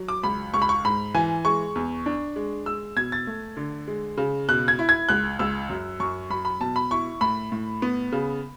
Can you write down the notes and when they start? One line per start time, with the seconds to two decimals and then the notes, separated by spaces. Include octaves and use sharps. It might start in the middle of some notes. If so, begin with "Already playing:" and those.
Already playing: F#3
0.08 D6
0.23 C#2 B5
0.54 C#2 C#6
0.62 B5
0.69 C#6
0.84 G#2 B5
1.15 E3 G#5
1.45 G#3 C#6
1.75 E2
2.06 D4
2.36 G#3
2.66 G#3 E6
2.96 B2 G#6
3.12 A6
3.27 A3
3.57 D3
3.87 G#3
4.17 C#3
4.49 B2 F#6
4.68 G#6
4.79 E4
4.89 G#6
5.09 C#2 F#6
5.39 C#2 E6
5.69 F#2
6.00 F#2 C#6
6.30 F#3 B5
6.45 B5
6.60 B2 A5
6.76 B5
6.91 E4 C#6
7.21 A2 B5
7.52 A2
7.82 B3
8.12 C#3